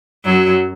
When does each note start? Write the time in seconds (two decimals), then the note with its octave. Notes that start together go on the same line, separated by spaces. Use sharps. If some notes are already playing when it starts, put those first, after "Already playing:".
0.25 F#2 F#3